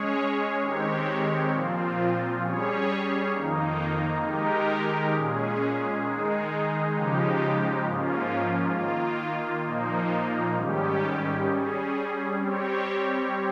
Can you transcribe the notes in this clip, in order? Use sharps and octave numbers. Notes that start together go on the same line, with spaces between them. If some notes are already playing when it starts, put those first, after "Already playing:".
Already playing: G#3 C#4 G#4 C#5
D#3 G#3 C4 G4 C#5
A#2 F3 C4 F4
G3 C#4 G#4 C#5
F2 D#3 A#3 D#4
D#3 G#3 D#4 G4 A#4
A#2 G#3 C#4 G#4
D#3 G#3 D#4 G#4
C#3 F3 G#3 D#4 G4
G#2 F3 A#3 C#4 F4
D#3 A#3 F4
A#2 F3 A#3 D#4
G#2 D#3 G3 C#4 G4
G3 C#4 G#4
G3 C4 G4 C#5